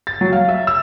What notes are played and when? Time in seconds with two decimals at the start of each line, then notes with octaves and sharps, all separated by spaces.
0.07 A6
0.21 F#3
0.33 F5
0.49 E5
0.67 E6